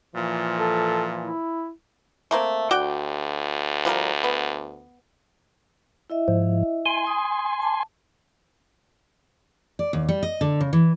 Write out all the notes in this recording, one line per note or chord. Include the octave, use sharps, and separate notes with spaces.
A#2 E3 F3
A4
E4
A3 A#3 C4
D2 F#4 D5 G5
F3 G3 A#4
B3
E4 D#5 E5
G#2 F3
G#5 C6
D#6
A5 D6
D5
D#2
G3
D#5
D3
C#3
E3